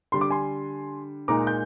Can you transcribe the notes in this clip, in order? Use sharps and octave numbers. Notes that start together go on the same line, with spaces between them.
D3 G3 D4 C6
D6
G#5 C6
A#2 G#3 D#4 A#5 D6
G6